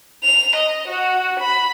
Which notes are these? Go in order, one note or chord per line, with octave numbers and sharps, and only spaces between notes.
F7
D#5
F#4
B5